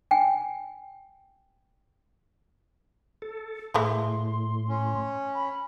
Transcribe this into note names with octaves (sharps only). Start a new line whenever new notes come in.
G5 G#5
A4
A2 E3 G#3 A3 C6
C#4
B5